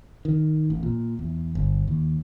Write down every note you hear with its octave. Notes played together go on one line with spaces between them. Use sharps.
D#3
A1
A#2
E2
G1
D#2